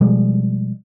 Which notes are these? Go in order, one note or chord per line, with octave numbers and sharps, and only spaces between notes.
B2 F3 G3 G#3